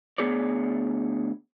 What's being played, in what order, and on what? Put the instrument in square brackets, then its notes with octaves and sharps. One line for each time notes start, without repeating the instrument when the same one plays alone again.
[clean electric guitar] D2 B3 G#4 C#5 D5